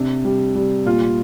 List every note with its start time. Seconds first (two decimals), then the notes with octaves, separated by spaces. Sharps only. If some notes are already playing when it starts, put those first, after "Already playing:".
Already playing: C3 D4
0.25 G3
0.55 G3
0.86 A#2 F4